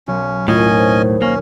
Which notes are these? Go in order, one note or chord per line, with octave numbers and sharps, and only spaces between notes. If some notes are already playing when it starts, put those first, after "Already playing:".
B1 C#4
D#2 A2 C#4 F4 D#5 G#5
C5
A#3 C#4